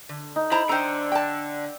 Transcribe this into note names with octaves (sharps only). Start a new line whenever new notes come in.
D3
D#4
E4 C5 A#5 B5
D3 C5 E5 G5 A#5
D5 G5 A5